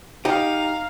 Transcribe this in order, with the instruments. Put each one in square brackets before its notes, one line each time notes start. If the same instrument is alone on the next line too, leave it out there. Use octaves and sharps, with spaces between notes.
[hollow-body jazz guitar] D#4 G4 [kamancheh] F5 A#5